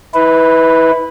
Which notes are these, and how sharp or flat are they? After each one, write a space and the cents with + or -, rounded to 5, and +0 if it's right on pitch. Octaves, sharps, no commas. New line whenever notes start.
E4 -30 B4 +0